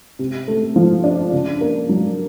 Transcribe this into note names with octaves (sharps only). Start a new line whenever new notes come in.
C3
A3
F3
D4
C#3
A#3
F#3